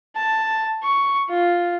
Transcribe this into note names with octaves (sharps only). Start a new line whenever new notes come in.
A5
C#6
F4